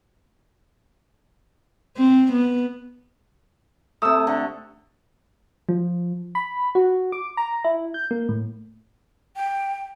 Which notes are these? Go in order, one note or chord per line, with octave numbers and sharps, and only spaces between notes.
C4
B3
C3 A3 D#6 E6
D3
F3
B5
F#4
D6
A#5
E4
G6
A#3
A2
G5